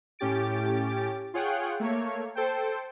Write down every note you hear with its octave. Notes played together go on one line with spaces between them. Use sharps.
A2 C#4 G4 A6 D7
F4 G#4 C#5 F#5 G5
A3 A#3 C#5
A4 C5 G5